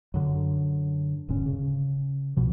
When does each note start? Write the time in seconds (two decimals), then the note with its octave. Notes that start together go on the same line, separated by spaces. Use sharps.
0.14 F#2 D3
1.28 D1 G#2 D3 C#4
1.46 C#3
2.37 C2 B2 F3